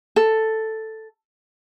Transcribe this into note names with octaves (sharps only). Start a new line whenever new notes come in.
A4